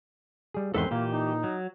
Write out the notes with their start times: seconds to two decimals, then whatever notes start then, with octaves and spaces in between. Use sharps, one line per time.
0.54 G3 G#4
0.74 E2 G#2 D#3 C4 A4 B4 C6
0.91 A#2 E3 A#3 G4
1.11 D#4
1.44 F#3